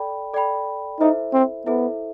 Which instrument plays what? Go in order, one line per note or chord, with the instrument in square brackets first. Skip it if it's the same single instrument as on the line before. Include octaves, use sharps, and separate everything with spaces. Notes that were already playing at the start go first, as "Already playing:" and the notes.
Already playing: [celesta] A4 D5 G5 B5
A4 D5 G5 B5
[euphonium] D#4 [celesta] E4 A4 C5 E5
[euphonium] C4
[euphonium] B3 [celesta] E4 A4 C5 E5